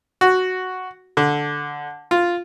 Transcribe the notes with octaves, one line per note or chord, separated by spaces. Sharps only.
F#4
D3
F4